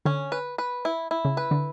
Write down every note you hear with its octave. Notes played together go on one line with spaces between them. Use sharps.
D3 C#4
B4
B4
E4
E4
C#3
B4
D3